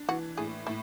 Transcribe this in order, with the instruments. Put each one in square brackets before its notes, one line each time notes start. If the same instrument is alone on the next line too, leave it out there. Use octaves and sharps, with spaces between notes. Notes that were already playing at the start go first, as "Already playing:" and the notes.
Already playing: [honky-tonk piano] D4
[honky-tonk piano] E3 [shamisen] F#4
[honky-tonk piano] A2 [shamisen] G#4
[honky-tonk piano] A2 [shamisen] E4